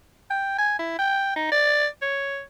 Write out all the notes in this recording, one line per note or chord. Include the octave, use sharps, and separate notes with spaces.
G5
G#5
E4
G5
D#4
D5
C#5